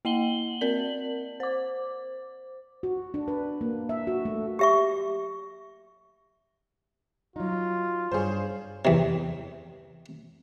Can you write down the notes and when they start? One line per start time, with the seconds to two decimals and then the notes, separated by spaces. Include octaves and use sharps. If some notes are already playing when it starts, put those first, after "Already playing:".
0.05 A#3 D#5 F#5 F#7 G7
0.61 C4 A#4 D5 F#7
1.40 C5 D6
2.83 F#4
3.14 D4
3.28 B4
3.61 A#3
3.89 E5
4.07 F#4
4.25 A3
4.59 G4 E5 C#6
7.36 F#3 D#4 F4
8.12 G2 G#4 C5 C#5 F5
8.85 E2 C3